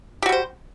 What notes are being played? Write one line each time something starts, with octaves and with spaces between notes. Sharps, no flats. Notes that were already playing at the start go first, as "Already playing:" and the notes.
G3 F#4 G4 C5